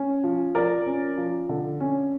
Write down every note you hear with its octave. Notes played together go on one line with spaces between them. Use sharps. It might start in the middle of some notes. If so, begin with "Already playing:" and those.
Already playing: C#4
F3
F3 A#4 D5
C#4
F3
D3
C#4